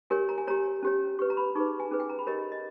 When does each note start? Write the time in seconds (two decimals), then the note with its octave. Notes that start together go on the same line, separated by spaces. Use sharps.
0.10 G4 A#4 C#5 G#5
0.29 A#5
0.38 G#5
0.47 G4 C#5 A#5
0.83 C#4 G4 C#5
1.19 G4 B4 C#6
1.30 A#5
1.37 B5
1.55 D#4 G#4 B4 C#6
1.80 G#5
1.91 C#4 G#4 B4
2.00 G5
2.09 A#5
2.19 B5
2.27 G4 A#4 C#5 D#5
2.39 D#5
2.52 D#5